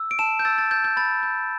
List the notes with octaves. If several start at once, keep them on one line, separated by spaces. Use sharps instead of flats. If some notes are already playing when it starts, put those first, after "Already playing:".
Already playing: E6
D7
A5 E7
G6
E6 A6
A6
G6 A6
G6
B5 A6
G6